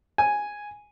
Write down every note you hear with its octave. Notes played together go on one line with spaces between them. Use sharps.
G#5